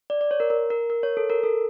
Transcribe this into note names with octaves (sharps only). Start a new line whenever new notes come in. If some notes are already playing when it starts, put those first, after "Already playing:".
D5
D5
C#5
A#4
A#4
A#4
A#4
C#5
A4
A#4
A4